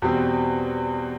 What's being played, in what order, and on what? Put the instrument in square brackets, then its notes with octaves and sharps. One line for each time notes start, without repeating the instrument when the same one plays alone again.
[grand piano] E2 B2 G3 C4